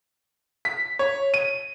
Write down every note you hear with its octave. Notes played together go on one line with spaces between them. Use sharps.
B6
C#5
D#7